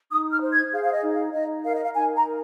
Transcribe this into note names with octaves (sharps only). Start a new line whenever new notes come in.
D#4 D#6
F6
C5
G#6
G#4 F5
F5
D#5
D#4
F5
D#4 D#5
A#4 F5
D#5
F5
D#4 G#5
A#5
A#4